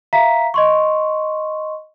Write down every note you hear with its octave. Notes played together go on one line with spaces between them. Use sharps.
E5 F5 A#5 B6
D#5 C6 C#6